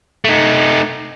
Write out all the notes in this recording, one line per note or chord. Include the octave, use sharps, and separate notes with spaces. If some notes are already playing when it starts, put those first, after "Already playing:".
A3 D#4